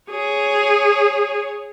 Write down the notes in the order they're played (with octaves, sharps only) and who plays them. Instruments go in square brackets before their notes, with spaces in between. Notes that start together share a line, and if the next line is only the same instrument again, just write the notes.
[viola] G#4 C#5